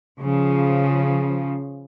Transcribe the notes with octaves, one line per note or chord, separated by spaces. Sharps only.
C#3 F3